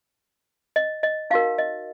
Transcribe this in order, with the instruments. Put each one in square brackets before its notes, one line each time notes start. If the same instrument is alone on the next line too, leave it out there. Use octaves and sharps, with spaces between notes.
[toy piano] D#5
D#5
D#4 F#4 A#4 F5
D#5